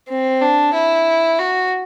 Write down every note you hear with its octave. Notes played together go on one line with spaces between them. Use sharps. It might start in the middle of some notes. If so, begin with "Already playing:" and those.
C4
D4
E4
F#4